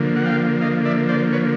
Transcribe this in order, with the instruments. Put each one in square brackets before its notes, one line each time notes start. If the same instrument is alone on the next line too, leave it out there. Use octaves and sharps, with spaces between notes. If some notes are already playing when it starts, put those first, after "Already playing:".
Already playing: [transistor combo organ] D3 F3 A#3
F#5
F5 G5
D#5 F5
D5 E5
C5 D5
B4 C#5